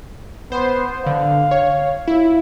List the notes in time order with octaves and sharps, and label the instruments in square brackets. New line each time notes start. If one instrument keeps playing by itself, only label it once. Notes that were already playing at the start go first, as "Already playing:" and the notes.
[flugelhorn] B3 [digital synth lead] C5
[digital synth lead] D3 [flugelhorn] F5
[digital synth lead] C#5
E4